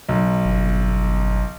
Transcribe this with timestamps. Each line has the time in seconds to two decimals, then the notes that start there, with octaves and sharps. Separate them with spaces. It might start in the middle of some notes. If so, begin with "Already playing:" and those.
0.09 B1
0.45 G1